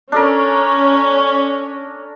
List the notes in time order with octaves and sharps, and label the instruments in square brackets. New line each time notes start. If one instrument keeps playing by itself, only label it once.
[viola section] C#4 [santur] D4 A4 A#4